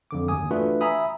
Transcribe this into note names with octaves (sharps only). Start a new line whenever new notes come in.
F2 D3 D6
G1 D#2 G#5 D#6
E3 A3 D4 F4 F#4 B4
E5 G#5 A#5 B5 D#6